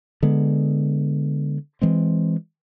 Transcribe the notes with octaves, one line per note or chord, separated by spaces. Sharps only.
D3 G#3 B3
E3 G#3 C4